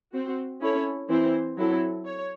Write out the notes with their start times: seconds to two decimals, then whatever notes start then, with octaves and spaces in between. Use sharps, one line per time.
0.14 C4 F#4 C5
0.61 C#4 E4 A4 C#5
1.09 E3 C4 E4 C5
1.57 F#3 C4 E4 A4
2.05 C#5